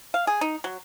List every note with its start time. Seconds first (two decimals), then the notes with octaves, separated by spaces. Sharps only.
0.14 F5
0.27 G#4
0.41 D#4
0.64 F#3